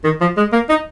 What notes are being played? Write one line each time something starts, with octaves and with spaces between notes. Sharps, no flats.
D#3
F3
G#3
A#3
D#4